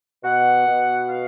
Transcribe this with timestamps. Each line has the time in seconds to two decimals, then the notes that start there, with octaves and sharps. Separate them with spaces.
0.23 B2 F#5
0.66 B2
1.08 F5